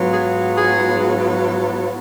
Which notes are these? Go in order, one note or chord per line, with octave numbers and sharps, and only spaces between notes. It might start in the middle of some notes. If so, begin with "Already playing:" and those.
Already playing: G#2 F#3 B3 F4
G#4
G#4